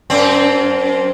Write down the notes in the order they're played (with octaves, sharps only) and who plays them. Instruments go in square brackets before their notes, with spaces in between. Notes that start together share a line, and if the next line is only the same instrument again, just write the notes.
[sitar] F#2 C4